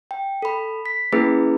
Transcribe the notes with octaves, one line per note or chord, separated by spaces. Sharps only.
G5
A4 B5
B6
A#3 C#4 E4 G#4 B4